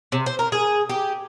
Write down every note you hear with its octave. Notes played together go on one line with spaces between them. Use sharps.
C3
C5
A#4
G#4
G4